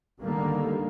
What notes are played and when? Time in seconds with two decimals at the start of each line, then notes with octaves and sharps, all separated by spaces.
0.21 D3 D#3 G3 A#3